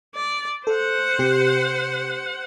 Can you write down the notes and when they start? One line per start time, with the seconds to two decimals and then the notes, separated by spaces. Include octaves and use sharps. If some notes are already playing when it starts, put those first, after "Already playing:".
0.15 D5
0.67 A4 C5 F#5
1.19 C3 G4 C7